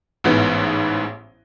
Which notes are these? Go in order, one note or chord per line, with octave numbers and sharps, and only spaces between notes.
A1 G#2 E3 B3